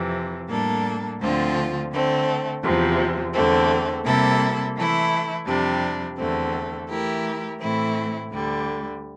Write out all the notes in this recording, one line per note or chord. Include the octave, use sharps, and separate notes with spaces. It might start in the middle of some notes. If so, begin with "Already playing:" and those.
Already playing: F2 C3 E3
A2 G3 A#3 D4 A4
D2 D3 F3 C4 F4
D3 A3 C4
E2 C3 F3
E2 D3 A3 C4
C3 G3 A#3 E4 A4
E3 A3 E4
F2 C3 G3 D4
E2 D3 A3 C4
E3 A3 E4 G4 A#4
A2 E3 A3 C4 E4
D2 D3 G3